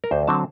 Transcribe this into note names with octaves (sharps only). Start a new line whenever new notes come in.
A#4
D2 C5
D3 F#3 C4 A5